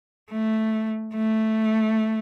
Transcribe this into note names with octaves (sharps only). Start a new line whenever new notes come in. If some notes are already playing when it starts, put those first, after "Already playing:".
A3
A3